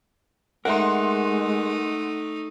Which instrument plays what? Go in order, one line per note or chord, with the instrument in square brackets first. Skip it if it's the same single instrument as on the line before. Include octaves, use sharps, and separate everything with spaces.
[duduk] G#3 [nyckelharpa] A3 D#4 [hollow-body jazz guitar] A#4 E5 [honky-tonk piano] F#5 C6